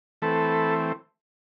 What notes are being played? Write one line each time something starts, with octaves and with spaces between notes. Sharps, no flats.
E3 A3 C4 A4 B4